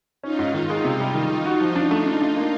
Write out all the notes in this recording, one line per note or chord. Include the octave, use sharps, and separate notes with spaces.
C#4 D#4 F4
G#2
D#3
G#3
C3
G3
D#3
D#3
F#4
F3
D4
A3
D4
D4
A#3